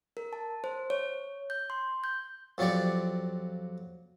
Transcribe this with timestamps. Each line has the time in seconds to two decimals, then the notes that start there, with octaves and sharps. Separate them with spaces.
0.17 A#4
0.33 A5
0.64 C5
0.90 C#5
1.50 G6
1.70 C6
2.04 G6
2.58 F2 F#3 F4 G4 D5 C#6